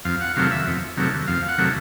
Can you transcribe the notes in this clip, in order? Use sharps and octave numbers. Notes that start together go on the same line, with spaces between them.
F2 F5
F#5
C3 D#3 F#3 A3 F5
E5
F2
C3 D#3 F#3 A3
F2 F5
F#5
C3 D#3 F#3 A3